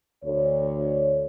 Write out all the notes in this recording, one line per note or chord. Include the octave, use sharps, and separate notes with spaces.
D2 C#5